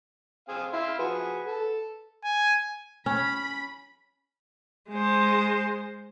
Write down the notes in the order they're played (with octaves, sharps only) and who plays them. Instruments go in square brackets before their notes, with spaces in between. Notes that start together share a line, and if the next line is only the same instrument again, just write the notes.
[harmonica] C4 G#4 F5
[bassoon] E4 [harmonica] F5 C6 E6
[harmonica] F3 F#4 G#4 [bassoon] B4
[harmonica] A4
[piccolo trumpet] G#5
[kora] C#4 [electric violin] B5
[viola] G#3 C5